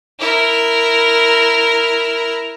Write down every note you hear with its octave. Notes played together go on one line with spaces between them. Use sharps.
E4 A#4